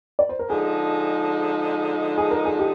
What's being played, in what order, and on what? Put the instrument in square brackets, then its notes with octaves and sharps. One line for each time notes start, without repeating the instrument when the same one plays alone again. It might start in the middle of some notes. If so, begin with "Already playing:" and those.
[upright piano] D5
C5
A#4
[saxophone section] D3 F3 G#3 D#4 [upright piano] G#4
[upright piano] G#4
A#4
G#4
G4